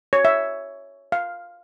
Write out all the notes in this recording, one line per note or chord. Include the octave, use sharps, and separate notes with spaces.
C#5
E5
F5